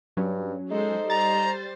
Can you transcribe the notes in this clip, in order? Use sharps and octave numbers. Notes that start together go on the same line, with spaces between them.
G2 F#3 C#4
G#3 D#4 A4 C5
G3 C5 A#5 A6